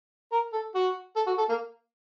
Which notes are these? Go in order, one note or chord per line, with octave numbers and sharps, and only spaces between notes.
A#4
A4
F#4
A4
F#4
A4
A#3